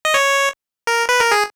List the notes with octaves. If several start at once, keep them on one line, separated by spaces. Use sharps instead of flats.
D#5
C#5
A#4
B4
A#4
G#4